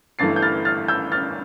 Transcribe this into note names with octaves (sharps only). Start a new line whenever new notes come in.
G1 G2 E3 A3 A6 C7
G6
F6 A6
F6 A6
E6 G6
F6 A6